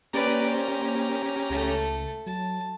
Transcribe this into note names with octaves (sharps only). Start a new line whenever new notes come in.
A#3 C#4 G4 B4 D5 A#5
C5
C#2 A3 A4
F#3 A5